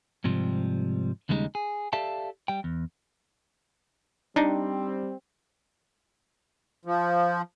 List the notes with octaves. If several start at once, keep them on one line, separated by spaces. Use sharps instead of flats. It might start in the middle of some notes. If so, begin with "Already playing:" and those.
G#2 C3 F3 G3
D#2 C#3 G3 G#3 C4 D#4
G#4
G4 A4 D5 E5 F5 A5
G3 G5
E2
G3 C4 D4 D#4
F3